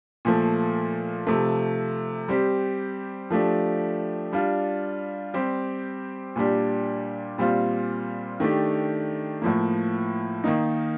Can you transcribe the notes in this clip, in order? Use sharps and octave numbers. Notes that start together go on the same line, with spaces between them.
A#2 F3 A3
C3 F3 A3
G3 C4 G4
F3 A3 D4 G4
G3 D4 F4
G3 C4 G4
A#2 G3 D4 G4
A#2 G3 C4 F4
D#3 A3 D4 G4
A2 F3 A#3
D#3 A#3 D#4